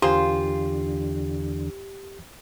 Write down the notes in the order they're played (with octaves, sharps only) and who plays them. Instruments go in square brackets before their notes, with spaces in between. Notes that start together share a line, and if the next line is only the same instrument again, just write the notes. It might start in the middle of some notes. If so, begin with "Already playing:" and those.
[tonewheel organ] E2 D3 [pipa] A#3 G#4 C5 [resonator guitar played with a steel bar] F4 [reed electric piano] G4